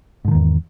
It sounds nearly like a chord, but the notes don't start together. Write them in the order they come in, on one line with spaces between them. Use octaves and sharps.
G#2 D3 D#3 E2